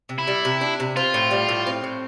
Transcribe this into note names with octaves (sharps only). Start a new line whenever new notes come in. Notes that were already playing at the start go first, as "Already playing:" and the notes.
C3
E4
G3
C3
D4
C3
C4 F4
A2
G3
A2
C4
A2